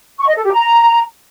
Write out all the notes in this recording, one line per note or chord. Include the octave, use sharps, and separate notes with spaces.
C#6
D#5
A4
G4
A#5